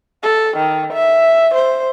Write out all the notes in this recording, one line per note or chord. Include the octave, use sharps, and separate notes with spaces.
A4
D#3
E5
C5